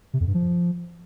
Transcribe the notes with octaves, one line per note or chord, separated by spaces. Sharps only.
C3
F2
G2
F3